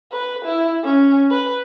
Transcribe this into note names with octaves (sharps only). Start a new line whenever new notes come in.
B4
E4
C#4
B4